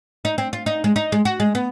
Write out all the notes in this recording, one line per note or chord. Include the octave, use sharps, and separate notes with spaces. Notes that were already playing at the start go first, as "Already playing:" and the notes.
D#4
C4
F4
D#4
G#3
D#4
G#3
F#4
G#3
B3